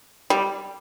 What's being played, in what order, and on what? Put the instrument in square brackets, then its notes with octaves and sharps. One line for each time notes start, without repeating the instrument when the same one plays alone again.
[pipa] G3